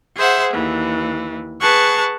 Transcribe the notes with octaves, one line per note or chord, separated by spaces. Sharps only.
G#4 C5 E5 F#5
D#2 E3
G#4 B4 F#5 A5 C#6